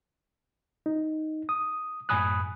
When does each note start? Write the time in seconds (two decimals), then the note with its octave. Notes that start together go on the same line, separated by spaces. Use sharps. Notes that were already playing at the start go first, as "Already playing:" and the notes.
0.86 D#4
1.49 D#6
2.09 F#2 A2 G#5 B5 D#6 F#6